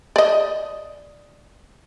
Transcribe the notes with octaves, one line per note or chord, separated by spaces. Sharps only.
D5 D#5